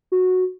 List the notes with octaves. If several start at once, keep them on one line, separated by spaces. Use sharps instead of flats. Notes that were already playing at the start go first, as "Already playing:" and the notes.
F#4